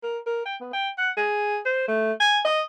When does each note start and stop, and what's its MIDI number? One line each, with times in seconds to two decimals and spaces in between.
0.03 0.18 70
0.26 0.43 70
0.45 0.55 79
0.61 0.71 59
0.73 0.89 79
0.98 1.09 78
1.17 1.57 68
1.65 1.87 72
1.88 2.12 57
2.20 2.39 80
2.45 2.62 75